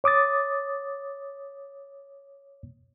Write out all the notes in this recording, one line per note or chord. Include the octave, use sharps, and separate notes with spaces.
C#5 D6 D#6 A6